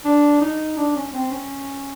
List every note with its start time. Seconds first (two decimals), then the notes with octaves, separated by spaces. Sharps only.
0.05 D4
0.41 D#4
0.77 D4
0.96 C#4
1.14 C4
1.31 C#4